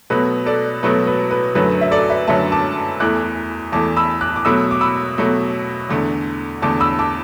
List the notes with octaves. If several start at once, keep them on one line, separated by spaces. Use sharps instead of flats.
B2 F#3 A3 B4
A4 D5
B2 F#3 A3 B4
B4
B4
F#2 D3 F#3 A3 B4
E5
A4 D5
B4 E5
F#2 D3 F#3 A3 E5 A5
A5 D6
E2 E3 A3 D6 F#6
E2 E3 A3 A5 D6
B5 E6
D6 F#6
D6
B2 F#3 A3 B5 E6
D6
B5 E6
B2 F#3 A3
E2 D3 A3
E2 D3 A3 A5 D6
B5 E6
A5 D6